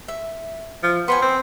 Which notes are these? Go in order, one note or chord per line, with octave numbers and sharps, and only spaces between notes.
E5
F3
B3 C5 G5 G#5
C4